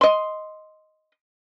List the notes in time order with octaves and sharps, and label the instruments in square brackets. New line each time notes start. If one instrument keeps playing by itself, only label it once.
[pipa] D#5 C6